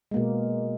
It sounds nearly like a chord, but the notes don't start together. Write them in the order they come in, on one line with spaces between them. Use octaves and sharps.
G#3 A#3 B2